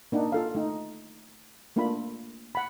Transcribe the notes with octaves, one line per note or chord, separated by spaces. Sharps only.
A#3 D4 D#4 F#5
F4 A4 F5
A3 D#4
A3 A#3 D4 F4 E5 B5
F#5 B5